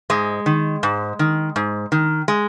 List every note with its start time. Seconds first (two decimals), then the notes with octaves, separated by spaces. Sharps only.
0.10 G#2 G#3
0.46 D#3
0.83 G#2
1.19 D#3
1.56 G#2
1.92 D#3
2.28 G#3